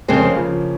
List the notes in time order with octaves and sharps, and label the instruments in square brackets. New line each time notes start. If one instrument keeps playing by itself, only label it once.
[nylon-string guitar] F2 C#3 G#3 C4 [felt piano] A#3 C#4
[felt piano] C#3 F3